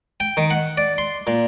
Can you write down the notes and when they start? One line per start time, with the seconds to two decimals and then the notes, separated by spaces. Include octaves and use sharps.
0.20 G5
0.37 D#3
0.50 F#5
0.77 D5
0.98 C6
1.27 A#2